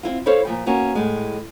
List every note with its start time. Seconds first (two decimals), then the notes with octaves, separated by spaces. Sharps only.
0.03 C4 E4 F4
0.26 E4 A4 C5 C#5 F5
0.45 A#2 F3 G5
0.66 A#3 B3 C#4 F#4
0.95 A2 G#3